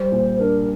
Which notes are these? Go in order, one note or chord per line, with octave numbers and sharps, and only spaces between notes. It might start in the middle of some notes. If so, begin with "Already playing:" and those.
Already playing: G3 C5
A#2
D4 A#4